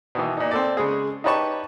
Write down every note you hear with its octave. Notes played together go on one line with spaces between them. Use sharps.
B2 D#3 E3
A#2 D#4
C4 A4 D5
C#3 G#3 G#4
D#4 G4 B4 C#5 A5 C#6